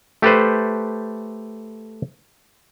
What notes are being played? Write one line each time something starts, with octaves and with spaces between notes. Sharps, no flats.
A3 G4 A4 B4 C5